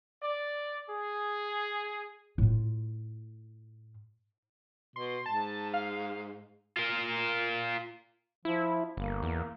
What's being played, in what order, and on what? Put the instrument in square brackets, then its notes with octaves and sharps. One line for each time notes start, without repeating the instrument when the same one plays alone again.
[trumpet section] D5
G#4
[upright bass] A2 F4
[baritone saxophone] B2 [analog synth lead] C6
[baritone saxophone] G#2 [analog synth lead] A5
[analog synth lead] F5
[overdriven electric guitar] F4 A#4
[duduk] F3 [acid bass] E4
[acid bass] G1 [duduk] A#3
[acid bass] E2